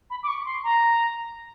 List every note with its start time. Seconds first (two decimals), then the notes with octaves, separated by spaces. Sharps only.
0.10 B5
0.23 D6
0.28 C#6
0.45 C6
0.64 A#5